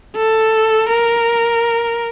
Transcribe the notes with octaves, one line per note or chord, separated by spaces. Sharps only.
A4
A#4